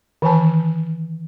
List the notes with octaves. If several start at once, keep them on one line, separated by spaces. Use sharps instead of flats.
D#3 E3 G#5 A5